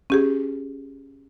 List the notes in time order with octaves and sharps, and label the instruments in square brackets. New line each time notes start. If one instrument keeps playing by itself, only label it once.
[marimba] C#4 G4 G#4